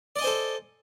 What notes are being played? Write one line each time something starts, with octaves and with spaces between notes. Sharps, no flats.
A4 C5 D5 D#5 G#5